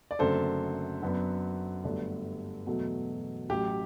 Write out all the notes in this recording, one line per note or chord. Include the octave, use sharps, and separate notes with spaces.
D5
F#1 F#2 D3 A3 C4 A4 C5
F#2 F#3 B3 D4
G1 G2 F#3 A3 D4
E1 E2 B2 F#3 A3
A1 A2 F#3 G4